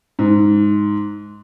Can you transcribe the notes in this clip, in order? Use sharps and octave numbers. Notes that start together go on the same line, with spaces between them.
G#2